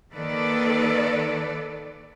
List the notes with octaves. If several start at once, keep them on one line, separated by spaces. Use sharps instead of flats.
D#3 A#3 A4 B4 D5